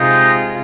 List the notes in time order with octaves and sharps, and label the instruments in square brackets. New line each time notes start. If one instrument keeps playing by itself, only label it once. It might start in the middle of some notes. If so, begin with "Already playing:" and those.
Already playing: [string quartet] C3 G#3 F4 [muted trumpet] D#4